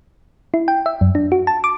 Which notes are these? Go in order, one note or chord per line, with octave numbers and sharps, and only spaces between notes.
E4
G5
E5
F#2
D4
F#4
A5
D6